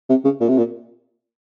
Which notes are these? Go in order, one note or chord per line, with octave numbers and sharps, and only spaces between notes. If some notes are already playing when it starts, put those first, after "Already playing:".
C3
C#3
A#2
C3
A#2